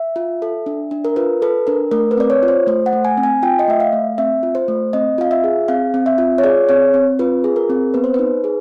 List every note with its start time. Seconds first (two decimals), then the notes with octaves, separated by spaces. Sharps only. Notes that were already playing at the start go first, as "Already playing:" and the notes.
Already playing: E5
0.16 F4
0.42 A4
0.66 D4
0.91 D4
1.05 A#4
1.16 F4 B4
1.42 A4 B4
1.67 D4 A#4
1.91 A3 A#4
2.11 B4
2.17 C4 D5
2.30 C#5
2.43 F4
2.48 C5
2.67 A3 C5
2.86 F#5
2.93 A3
3.05 G#5
3.18 C4
3.23 G#5
3.43 F4 G5
3.59 D#5
3.68 A3 E5
3.80 F5
3.93 A3
4.18 C4 E5
4.43 F4
4.55 C5
4.68 A3
4.93 C4 D#5
5.18 F4 F5
5.31 E5
5.44 G#4
5.68 C4 F5
5.94 C4
6.06 E5
6.18 F4
6.38 C#5
6.44 G#4 D5
6.69 C4 C#5
6.94 C4
7.19 F4 B4
7.44 G#4
7.56 A#4
7.70 C4
7.94 B3 B4
8.04 C5
8.14 D#4 B4
8.44 G#4